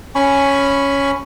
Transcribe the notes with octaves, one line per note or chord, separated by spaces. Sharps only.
C#4 G#5 B5 C#6